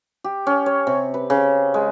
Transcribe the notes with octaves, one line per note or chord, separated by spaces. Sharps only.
G4
C#4
C#5
C3
B4
C#3
G#3